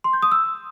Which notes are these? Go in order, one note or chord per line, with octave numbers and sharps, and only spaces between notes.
C6
G6
D#6
E6